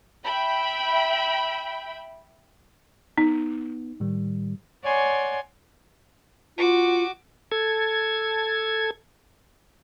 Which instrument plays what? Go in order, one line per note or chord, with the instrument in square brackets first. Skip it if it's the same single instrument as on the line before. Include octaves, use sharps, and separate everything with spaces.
[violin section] E5 G5 B5
[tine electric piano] B3 [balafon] D#4
[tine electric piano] A2 D#3 G3
[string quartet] C#5 D5 F#5 G#5 C6 C#6
[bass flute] F4 [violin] F#4 D6
[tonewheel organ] A4 G#6